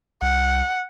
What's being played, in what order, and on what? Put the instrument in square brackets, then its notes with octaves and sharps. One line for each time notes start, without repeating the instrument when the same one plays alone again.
[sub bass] C2 [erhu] F#5